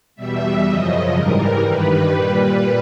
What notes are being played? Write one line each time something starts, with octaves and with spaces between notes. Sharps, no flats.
E2 B2 G3 E5
F#2 C#3 F3 D#5
G#2 E3 G3 A#4
G2 D#3 G3 B4
A#2 G3 B4